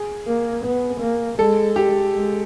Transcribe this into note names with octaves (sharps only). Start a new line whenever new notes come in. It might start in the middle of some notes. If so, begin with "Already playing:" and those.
Already playing: G#4
A#3
B3
A#3
G#3 A4
G4
G#3